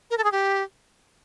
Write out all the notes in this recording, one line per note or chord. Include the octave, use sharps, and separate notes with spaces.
A#4
A4
G#4
G4